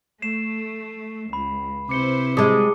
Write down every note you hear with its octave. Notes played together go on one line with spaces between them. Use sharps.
A3 C7 E7
C#2 B5
C3 E4 B4 C5 D6 C#7 G7
G3 G#3 A5 D6 D#6